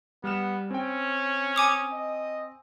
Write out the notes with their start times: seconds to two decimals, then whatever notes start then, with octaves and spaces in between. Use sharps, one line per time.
0.24 G3 B3 F6 E7
0.71 C4 C#4 G5
1.56 G#5 D6 D#6
1.93 D#5